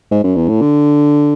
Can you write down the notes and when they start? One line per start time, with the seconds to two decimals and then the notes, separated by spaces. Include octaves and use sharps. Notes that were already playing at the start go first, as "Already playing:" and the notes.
0.11 G#2
0.24 F#2
0.36 E2
0.48 A2
0.62 D3